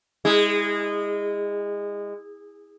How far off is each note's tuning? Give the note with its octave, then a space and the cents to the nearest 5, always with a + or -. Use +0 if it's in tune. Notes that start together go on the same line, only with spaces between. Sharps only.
G#3 -25 E4 -30